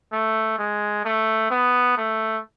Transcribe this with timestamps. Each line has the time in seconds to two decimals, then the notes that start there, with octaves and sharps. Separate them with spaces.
0.12 A3
0.58 G#3
1.05 A3
1.50 B3
1.97 A3